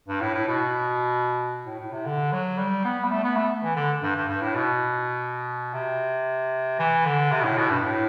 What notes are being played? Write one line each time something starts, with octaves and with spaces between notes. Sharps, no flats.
G2
A2
A2
B2
A2
A2
C3
D3
F#3
G3
B3
G3
A3
B3
A3
E3
D3
G2
G2
G2
A2
B2
C3
E3
D3
C3
B2
A2
B2
G2
A2